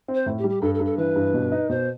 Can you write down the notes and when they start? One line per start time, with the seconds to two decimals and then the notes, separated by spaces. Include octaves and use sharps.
0.08 C4
0.15 C5
0.26 A2
0.39 G4
0.44 G3
0.49 G4
0.61 G2 A4
0.74 A4
0.80 G2
0.85 A4
0.98 E3 B4
1.16 G2
1.34 B2
1.52 D#4
1.69 B2 C5